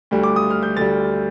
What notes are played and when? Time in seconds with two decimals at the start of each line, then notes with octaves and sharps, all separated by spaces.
0.11 D2 D3 G3
0.23 D6
0.36 D#6
0.50 F6
0.63 G6
0.77 D2 D3 G3 A6